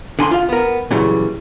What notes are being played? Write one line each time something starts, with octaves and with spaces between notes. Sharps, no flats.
D3 G#5 B5 C6
F4 F5
B3 A#4
A#2 C#3 E3 F#3 G3